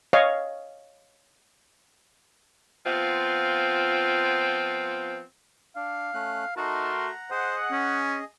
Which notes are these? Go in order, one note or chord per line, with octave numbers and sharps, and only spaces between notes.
C#5 D#5 F5
F3 B3 C4 F4
D4 F5
A3 C#4 F#6
A3 D#4 F#4 A#4 A5 C6
F#5 A#5
G#4 C5 D#5 F#5 D#6
C#4